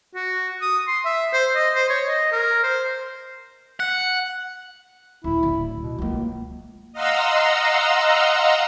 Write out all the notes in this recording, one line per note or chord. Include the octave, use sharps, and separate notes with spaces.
F#4
D#6
C6
E5
C5
D#5
C5
C#5
D#5
A#4
C5
F#5
D1 E4
D1 D3
B2
C#2 F#3 A#3
D#5 F5 F#5 A#5 C6 E6